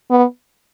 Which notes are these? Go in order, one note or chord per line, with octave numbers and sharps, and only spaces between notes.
B3